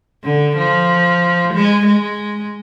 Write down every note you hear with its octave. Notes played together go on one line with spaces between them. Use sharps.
D3
F3
G#3
G#3